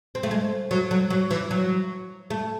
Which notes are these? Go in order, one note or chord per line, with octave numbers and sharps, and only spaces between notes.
C4
A3
G#3
F#3
F#3
F#3
E3
F#3
A3